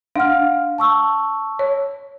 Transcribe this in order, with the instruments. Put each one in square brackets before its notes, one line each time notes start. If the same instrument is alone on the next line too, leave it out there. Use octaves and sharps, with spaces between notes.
[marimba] D4 [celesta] F5 F#5 F6
[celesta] A5 C#6 E6
[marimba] C#5